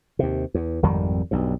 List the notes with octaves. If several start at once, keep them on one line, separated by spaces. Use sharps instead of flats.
D#2 C3
E2
G#1 F2 D#3 G3
B1 G2